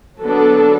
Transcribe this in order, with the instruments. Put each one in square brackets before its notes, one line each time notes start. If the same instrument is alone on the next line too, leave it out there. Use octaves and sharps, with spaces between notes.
[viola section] D3 F#3 B3 D4 A4